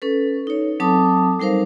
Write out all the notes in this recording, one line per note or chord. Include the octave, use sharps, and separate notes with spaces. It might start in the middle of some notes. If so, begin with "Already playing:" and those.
C#4 A4 B4
D#4 C#5
F#3 C4 A4 A5 D6 D#6
G3 D#4 A#4 C5 F5